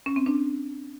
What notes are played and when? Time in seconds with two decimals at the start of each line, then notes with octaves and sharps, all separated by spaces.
0.06 C#4
0.16 C4
0.26 D4